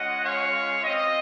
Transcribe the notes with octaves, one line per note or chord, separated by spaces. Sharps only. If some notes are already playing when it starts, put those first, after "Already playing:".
Already playing: G#3 C#4 F4 D#5 F#5
C#5 F5
C4 F4 C5 D#5